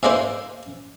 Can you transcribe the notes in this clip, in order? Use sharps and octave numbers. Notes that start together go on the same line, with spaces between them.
G#2 G#3 A#3 E4 C5